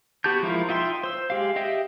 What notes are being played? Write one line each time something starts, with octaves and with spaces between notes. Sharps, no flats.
B3 F#4 G4 A5 G6
F3 G#3 E4 F4 A#4
D#4 F4 E5 G5 C6
C5 E6
G#3 G4 F5
G4 D#5 E5 G5